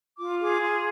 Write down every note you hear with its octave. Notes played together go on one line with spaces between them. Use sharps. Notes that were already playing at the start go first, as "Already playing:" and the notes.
F4 D6
G#4 D6
F4 C6